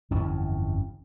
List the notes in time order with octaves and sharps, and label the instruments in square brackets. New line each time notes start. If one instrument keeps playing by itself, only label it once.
[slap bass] G1 F2 E3 C#4